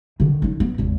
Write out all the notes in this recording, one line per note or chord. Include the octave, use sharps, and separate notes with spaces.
D3 D#3
F#3 D#4
B3
G#1 E2